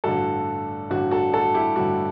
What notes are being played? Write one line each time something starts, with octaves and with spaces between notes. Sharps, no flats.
A1 G2 D3 F#4 A4
A1 G2 D3 F#4
F#4 A4
F#4 A4
E4 G4
A1 G2 D3 F#4